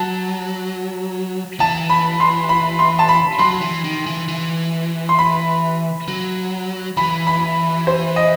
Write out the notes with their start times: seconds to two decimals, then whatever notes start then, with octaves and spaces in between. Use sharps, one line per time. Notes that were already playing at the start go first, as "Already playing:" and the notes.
Already playing: F#3 A5
1.60 E3 A5
1.90 B5
2.20 C6
2.49 B5
2.79 C6
2.99 A5
3.09 B5
3.39 F#3 C6
3.61 E3
3.84 D#3
4.06 E3
4.28 E3
5.09 C6
5.19 B5
6.08 F#3
6.97 E3 B5
7.27 B5
7.87 C5
8.16 D#5